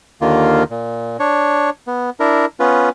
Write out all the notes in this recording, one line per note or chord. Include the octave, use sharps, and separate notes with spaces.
D#2 D3 D#3 A#3 F4
A#2
D4 C#5
B3
D4 E4 A#4
B3 C#4 F4 B4